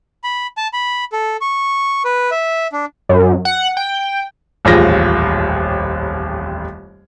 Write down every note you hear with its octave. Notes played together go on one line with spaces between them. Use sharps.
B5
A5
B5
A4
C#6
B4
E5
D4
F#2
F#5
G5
D#1 A1 F2 F4 G#4 A#6